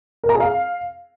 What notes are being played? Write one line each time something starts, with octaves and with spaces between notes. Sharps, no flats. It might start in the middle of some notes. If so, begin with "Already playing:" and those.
A#4
A#5
G#4
F5